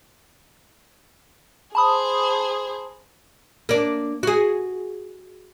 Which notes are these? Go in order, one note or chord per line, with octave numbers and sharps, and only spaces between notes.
G#4 C5 A5 B5 D#6
A#3 D4
F#4 G#4